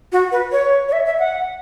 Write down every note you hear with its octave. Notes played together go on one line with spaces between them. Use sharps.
F#4
B4
C#5
C#5
E5
E5
F#5